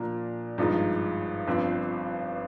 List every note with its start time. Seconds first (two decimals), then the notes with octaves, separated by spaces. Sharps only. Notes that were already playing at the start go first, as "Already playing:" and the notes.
Already playing: A#2 F3 A#3 D4
0.58 G#1 G2 F3 G#3 D#4
1.48 G1 G2 F3 C4